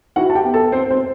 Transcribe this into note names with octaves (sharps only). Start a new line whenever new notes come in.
E4 F#4 F#5
A5
G4 G5
B3
A4 A5
C4 C5
C4 C5